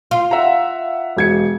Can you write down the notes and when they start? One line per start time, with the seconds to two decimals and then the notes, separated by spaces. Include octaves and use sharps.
0.11 F4
0.31 E5 F#5 A#5
1.17 E1 G#6 C#7